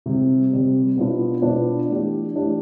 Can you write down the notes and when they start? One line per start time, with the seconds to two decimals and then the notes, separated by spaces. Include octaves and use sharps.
0.06 C3 G3 C4
0.51 C3 G3 C4
0.96 B2 B3 D4 F4 B4
1.42 B2 B3 D4 F4 B4
1.87 E3 A3 D4 G4
2.34 E3 A3 D4 G4